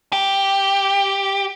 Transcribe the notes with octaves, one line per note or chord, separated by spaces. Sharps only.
G4